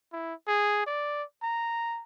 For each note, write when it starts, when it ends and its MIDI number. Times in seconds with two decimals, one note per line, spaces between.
0.12 0.34 64
0.48 0.85 68
0.86 1.23 74
1.43 2.04 82